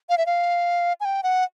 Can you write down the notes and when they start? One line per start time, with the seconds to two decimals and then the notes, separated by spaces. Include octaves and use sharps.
0.09 F5
0.18 E5
0.26 F5
1.00 G#5
1.05 G5
1.23 F#5